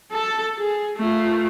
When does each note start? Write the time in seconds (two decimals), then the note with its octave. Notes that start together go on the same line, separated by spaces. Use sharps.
0.12 A4 A5
0.58 G#4
0.97 A3 F4